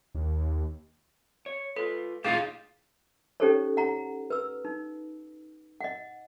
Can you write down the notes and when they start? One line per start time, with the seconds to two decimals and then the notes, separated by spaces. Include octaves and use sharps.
0.15 D#2
1.46 C#5
1.76 F4 A4 B4
2.25 A2 D#4 F4 G4 G#4 F5
3.40 C#4 D#4 G4 A4 C5 C#5
3.77 F#5 A#5
4.30 B4 E6
4.65 D#4
5.81 D#5 F#5